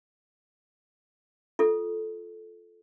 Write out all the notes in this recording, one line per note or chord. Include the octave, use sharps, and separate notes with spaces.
F4 A4